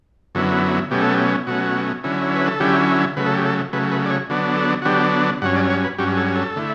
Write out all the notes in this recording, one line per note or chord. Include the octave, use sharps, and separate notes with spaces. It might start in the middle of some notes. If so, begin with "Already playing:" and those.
F#2 D3 F#3 B3 E4
B2 F#3 A3 C#4 G4
A4
G4
B2 F#3 A3 C#4 F#4
D3 F#3 C#4 E4
B4
A4
D3 F#3 C#4 E4 G4
C#3 F#3 A3 B4
A4
G4
A4
C#3 F#3 A3 B4
B4
D5
C#5
D3 F#3 B3 D4
A4
F#4
D3 F#3 B3 D4 G4
G2 F#3 C#4 F#5
D5
C#5
B4
G2 F#3 C#4 G4
A4
A4
D3 A3 E4